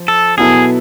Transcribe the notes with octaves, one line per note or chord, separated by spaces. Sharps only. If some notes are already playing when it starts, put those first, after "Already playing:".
Already playing: F3
A4
B2 F#3 B3 E4 G#4 A4